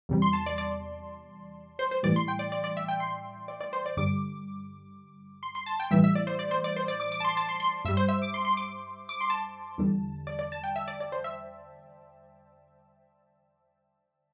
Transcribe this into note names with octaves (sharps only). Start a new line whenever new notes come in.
E2 C3 G3
C6
A5
D5
D5
C5
C5
A2 E3 G3 D5
C6
G5
D5
D5
D5
E5
G5
C6
D5
D5
C5
D5
G2 D3 G3 D6
C6
C6
A5
G5
A2 E3 G3 E5
E5
D5
C5
D5
C5
D5
C5
D5
D6
D6
A5
C6
A5
C6
C6
G2 G3 E5
C5
E5
D6
C6
C6
D6
D6
C6
A5
E2 D3 G3
D5
D5
A5
G5
E5
D5
D5
C5
E5